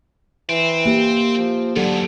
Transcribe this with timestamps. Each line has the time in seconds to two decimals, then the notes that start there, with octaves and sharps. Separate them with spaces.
0.49 E3 C4
0.86 A#3 G4
1.37 F3
1.76 E2 G#2 D3 F#3 G4 A4